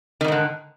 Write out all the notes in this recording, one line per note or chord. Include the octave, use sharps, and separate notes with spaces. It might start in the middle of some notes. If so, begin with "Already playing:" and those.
F2 G#2 D3 D#3